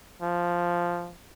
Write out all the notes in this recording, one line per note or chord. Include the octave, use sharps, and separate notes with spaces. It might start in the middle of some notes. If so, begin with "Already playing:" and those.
F3